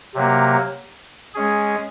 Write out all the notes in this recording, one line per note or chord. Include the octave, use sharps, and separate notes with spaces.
C3 F#3 A#3
G#3 C#4 G#4